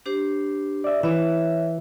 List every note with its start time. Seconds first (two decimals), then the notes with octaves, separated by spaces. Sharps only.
0.06 D4 G4 C5
0.84 D5 E5
1.03 E3 C#5 E5